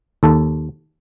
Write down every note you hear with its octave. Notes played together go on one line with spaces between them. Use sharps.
D#2 A4